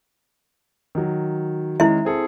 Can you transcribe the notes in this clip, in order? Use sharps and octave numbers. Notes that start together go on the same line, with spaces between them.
D#3 F#3
D#3 G#3 C#4 E4 E5
C4 G#4 A4